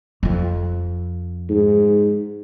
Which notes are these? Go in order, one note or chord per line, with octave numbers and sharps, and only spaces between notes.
F2 F3
G#2